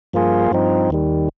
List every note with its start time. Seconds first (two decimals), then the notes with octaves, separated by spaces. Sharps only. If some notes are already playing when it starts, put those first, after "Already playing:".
0.13 G2 F3 A#3 F4 G#4
0.51 G2 F3 C4 D#4
0.90 D#2 D#3 G3